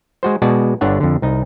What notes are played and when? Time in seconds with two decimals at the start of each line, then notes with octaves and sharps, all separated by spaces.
0.23 G#3 F#4 C5
0.42 B2 G#3 F#4 D5 A5
0.81 G1 D3 D4 C#5 F#5
1.00 F2 D3
1.22 C2 D#4